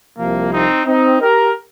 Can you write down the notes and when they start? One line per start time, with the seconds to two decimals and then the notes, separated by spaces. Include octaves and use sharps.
0.16 C2 C3 F3 A#3
0.51 C4 D#4
0.86 C4 D#4
1.21 G4 A#4